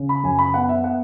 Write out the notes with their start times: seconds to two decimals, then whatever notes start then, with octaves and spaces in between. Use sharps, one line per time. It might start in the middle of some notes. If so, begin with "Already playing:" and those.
Already playing: C#3
0.09 B5
0.23 F#2 G#5
0.39 B5
0.54 B3 F#5
0.69 E5
0.83 B3 F#5